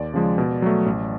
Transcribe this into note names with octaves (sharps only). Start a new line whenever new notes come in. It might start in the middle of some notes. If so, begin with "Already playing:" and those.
Already playing: D#2 D5
C#3 F3 G#3
B2
F#3 A3
A1